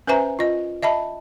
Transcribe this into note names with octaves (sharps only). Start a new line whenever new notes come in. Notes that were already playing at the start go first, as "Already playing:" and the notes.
C#4 B4 C5 E5 G#5 A#5
F4 D#5
D#5 E5 A5 B5